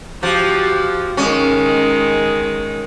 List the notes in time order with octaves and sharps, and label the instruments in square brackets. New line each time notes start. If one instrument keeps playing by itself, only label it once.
[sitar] F3 [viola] F#4 G4
[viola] D#3 G#3 [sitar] C#4